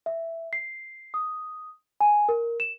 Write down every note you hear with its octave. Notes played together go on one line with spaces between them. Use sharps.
E5
C7
D#6
G#5
A#4
E7